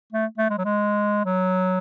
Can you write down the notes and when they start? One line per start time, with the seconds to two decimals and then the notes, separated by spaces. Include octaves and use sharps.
0.12 A3
0.38 A3
0.50 G#3
0.58 F#3
0.65 G#3
1.25 F#3